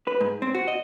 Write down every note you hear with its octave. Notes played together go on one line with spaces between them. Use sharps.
B4
G#2
C4
F#4
D#5